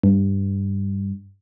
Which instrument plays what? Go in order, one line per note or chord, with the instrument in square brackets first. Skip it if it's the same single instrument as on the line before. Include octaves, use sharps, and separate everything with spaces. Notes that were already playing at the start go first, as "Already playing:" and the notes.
[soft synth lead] G2